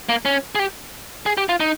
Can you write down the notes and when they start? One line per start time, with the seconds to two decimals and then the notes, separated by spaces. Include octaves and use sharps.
0.09 A#3
0.25 C#4
0.55 G#4
0.59 G4
1.26 G#4
1.38 G4
1.49 F4
1.60 D#4